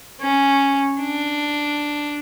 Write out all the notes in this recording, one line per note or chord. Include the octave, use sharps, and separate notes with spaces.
C#4
D4